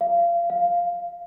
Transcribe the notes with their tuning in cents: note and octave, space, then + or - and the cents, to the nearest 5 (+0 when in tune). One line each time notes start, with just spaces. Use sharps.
F5 -25
F5 +0